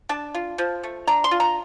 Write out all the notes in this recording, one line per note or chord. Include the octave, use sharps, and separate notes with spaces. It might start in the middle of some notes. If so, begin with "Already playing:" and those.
D4 A5
F4
F3
A3
D4 A#5
C6
F4
A#5